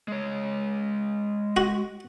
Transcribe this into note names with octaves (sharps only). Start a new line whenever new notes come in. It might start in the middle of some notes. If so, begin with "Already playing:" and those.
G#3 C#5
F#4